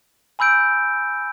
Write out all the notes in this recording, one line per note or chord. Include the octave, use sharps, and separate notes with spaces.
G#5 B5 E6 G6 D7